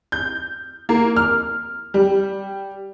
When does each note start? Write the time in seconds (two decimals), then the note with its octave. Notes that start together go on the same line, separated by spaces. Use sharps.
0.12 G6
0.89 A#3
1.16 F6
1.94 G3